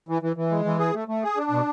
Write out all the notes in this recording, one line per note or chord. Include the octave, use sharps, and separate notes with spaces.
E3
E3
E3
G#3
E3
G#4
A3
A3
G#4
D4
B2